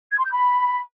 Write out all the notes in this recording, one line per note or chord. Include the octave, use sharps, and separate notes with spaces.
G#6
C6
G6
B5